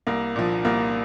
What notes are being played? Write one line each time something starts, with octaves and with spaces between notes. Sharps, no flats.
C2 A#3
A#2 F3
C2 A#3